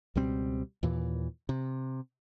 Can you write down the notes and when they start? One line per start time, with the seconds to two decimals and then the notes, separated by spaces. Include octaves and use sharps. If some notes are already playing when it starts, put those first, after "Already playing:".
0.15 C#2 B2 G3 C4
0.83 D#2 A#2 E3
1.49 C3